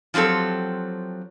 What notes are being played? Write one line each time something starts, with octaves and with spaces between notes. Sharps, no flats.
F3 F#3 C4 G4 A4